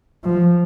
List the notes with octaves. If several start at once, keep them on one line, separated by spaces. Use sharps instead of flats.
F3